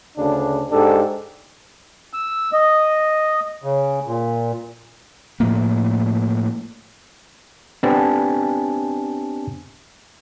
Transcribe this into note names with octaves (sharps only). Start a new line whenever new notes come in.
D2 C#3 D4
G#2 D4 G4 A4
E6
D#5
C#3
A#2
A2 F3 A3 A#3
B3 C4 D4 G4 G#5 A5